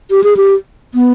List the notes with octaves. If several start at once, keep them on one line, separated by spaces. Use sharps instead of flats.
G4
G#4
G4
B3